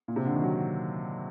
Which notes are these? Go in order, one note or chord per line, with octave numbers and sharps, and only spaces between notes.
A#2
C3
D3
D#3
F#3